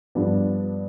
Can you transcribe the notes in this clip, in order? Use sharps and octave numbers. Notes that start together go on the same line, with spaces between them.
G2 F3 B3 D4 G4